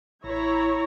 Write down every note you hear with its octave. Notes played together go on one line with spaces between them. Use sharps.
A1 E4 C#5 A#5